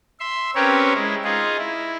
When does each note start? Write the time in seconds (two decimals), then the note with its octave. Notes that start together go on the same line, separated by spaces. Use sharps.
0.20 E5 C6
0.55 C4 C#4 G4 A#4 B4 C#5
0.94 G#3 E4
1.24 D#4 F4 G#4
1.58 E4